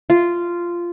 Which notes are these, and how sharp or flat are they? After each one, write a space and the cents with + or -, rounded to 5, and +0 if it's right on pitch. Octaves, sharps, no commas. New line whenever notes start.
F4 -10